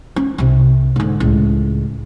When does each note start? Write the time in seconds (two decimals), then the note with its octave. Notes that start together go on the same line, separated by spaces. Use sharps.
0.16 C#4
0.38 C2 C3
0.96 G#2 D3
1.20 C#2 A2